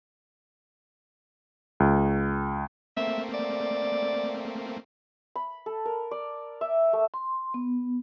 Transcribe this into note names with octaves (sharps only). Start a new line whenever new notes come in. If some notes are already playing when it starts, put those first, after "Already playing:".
C#2
A3 A#3 C4 E5
D5
B5
A4
A#4
D5
E5
A3
C6
B3